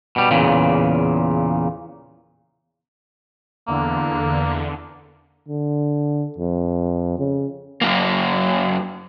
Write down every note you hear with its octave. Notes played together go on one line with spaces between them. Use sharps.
B2 G3
E2 A#2 C#3
E2 D3 A#3
D3
F2
C#3
F#2 A#3